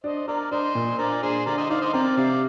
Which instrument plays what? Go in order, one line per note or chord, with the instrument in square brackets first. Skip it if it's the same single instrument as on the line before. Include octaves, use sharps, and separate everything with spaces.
[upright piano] D4 [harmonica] C5 D#5
[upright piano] D4 [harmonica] A#4 D5
[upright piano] D4 [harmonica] C5 D#5
[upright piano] A#2
[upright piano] D4 [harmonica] A#4 D5
[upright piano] D4 [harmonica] G#4 C5
[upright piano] D3 [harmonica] A#4 D5
[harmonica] C5 D#5
[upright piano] D#4 [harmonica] D5 F5
[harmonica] C5 D#5
[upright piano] C4 [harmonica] A#4 D5
[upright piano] C3 [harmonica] D5 F5